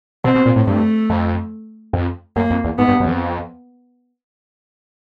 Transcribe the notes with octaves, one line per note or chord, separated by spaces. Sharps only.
B2 C4
B2
A#2
A2
G2 A3
F2
F2
F#2 A#3
F2
E2
G#2 B3
G2
F#2
E2
F2